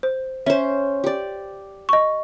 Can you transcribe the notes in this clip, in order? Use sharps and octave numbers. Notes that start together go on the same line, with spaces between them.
C5
C#4 C5 E5
G4 D5
D#5 C#6